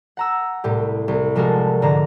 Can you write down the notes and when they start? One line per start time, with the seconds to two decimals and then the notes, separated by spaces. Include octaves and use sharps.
0.17 F#5 A#5 E6
0.64 C2 A2 G4
1.08 C2
1.35 C3 F3 G#3 F#4 A4 A#4
1.82 G#2 D3 D4 A#5